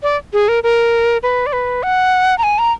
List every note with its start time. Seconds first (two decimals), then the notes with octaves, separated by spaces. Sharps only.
0.03 D5
0.33 G#4
0.48 A#4
0.64 A#4
1.23 B4
1.46 D5
1.53 B4
1.83 F#5
2.38 A#5
2.43 G#5
2.59 A#5